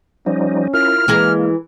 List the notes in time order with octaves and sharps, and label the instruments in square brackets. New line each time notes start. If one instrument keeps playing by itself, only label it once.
[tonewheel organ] F3 G3 D#4 [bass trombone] C#4
[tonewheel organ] E4 F4 A#4 [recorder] F6
[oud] E3 G#4 A#4 [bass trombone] G#3 [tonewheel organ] A#3